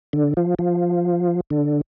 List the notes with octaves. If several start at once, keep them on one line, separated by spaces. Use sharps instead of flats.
D3
F3
F3
D3